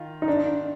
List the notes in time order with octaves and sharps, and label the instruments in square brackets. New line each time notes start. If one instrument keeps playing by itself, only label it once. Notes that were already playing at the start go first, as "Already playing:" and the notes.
Already playing: [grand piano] D#3 F4
[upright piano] D#4
D4